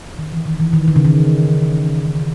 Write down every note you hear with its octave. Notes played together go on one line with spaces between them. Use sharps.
D#3
E3
D#3
E3
D#3
D#3
C#3
D#3